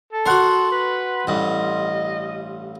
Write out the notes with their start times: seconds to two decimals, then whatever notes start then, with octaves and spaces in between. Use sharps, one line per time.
0.13 A4
0.26 F#4 A#4 F#5 C6
0.72 B4
1.27 A1 G2 D#5